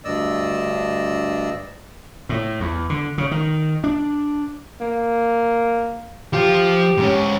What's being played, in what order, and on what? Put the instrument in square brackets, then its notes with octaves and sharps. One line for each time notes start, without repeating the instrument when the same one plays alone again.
[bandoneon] D2 G2 D5 D#5 E6
[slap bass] A2
E2
D3
C#3
D#3
D4
[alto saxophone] A#3
[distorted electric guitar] F3 F4 [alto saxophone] G4
[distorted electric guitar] G#2 C#4